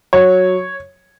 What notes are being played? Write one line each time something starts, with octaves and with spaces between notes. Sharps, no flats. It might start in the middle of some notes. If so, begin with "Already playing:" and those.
F#3 C#5